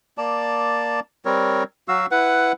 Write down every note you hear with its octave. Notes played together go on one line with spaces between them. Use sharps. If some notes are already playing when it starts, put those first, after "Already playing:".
A#3 D5 A5
G3 C4 A#4 C#5
F#3 F#4 F5 E6
E4 B4 F#5